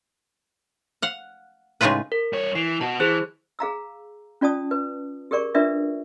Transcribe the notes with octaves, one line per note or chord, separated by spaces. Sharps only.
F5 F#5
A2 C#3 G#3 D#4 F4 B4
A#4
G2 C#5
E3 C7 D7
B2 F#4 A5
E3 G#4 C5 F#6
G#4 F5 A#5 E6
C#4 F4 D5 A5 D#6
B4
G4 G#4 A#4 D5 C#6
D4 F4 A#4 B4 D5 E5